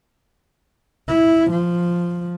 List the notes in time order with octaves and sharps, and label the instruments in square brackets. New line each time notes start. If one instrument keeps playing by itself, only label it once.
[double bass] E4
F3